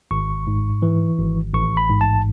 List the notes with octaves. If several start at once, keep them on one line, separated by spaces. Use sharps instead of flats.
G#1 C#6
G#2
E3
G#1
A1 C#6
B5
G#2
A5